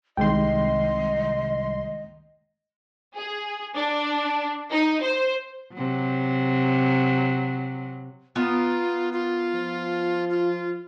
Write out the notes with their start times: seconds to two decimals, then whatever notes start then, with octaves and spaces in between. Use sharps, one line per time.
0.17 C2 D#3 G#3 D#5 G5 C6
3.16 G#4
3.75 D4
4.72 D#4
5.02 C5
5.74 C3 F#3
8.36 B3 F4 A#4
9.13 F4
9.55 F3
10.30 F4